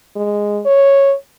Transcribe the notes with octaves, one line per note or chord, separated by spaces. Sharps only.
G#3
C#5